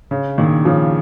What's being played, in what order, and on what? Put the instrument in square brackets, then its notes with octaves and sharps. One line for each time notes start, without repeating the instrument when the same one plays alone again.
[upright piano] C#3
A#2 D#3
C#3 F3